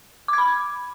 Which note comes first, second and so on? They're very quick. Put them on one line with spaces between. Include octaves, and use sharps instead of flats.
D6 G#6 B5